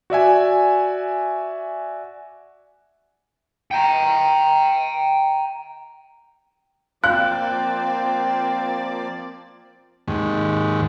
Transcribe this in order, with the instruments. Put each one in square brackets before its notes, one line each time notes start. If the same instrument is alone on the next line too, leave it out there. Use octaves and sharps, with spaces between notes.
[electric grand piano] F#4 D5 E5 G#5
[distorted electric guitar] G5 A#5
[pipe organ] F3 A#3 D5 [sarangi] C4 [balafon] F5 [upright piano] F#6
[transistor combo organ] D#2 G#2